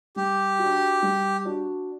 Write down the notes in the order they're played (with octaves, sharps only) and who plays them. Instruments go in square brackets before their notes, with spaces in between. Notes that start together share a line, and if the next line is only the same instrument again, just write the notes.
[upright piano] G3 [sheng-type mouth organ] G4
[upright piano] D4 F#4
G3
D4 F#4